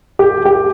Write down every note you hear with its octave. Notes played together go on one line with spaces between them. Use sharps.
G4
G4